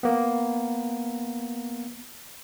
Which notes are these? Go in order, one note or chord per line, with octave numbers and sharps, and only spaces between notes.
A#3 B3